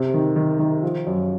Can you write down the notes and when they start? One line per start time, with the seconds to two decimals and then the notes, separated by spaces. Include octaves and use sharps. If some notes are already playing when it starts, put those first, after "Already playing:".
Already playing: C3
0.14 D#3
0.36 D#3
0.59 D#3
0.84 F3
1.07 F#2